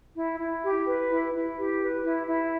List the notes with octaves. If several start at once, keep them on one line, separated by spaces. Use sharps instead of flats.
E4
E4
G4
B4
E4
E4
G4
B4
E4
E4